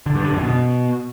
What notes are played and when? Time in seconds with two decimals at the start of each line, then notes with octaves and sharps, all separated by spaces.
0.06 D3
0.15 G2
0.24 D3
0.34 F#2
0.43 B2